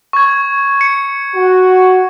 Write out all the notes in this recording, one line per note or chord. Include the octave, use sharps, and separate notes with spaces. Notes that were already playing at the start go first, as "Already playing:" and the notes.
C#6 G#6
C#7
F#4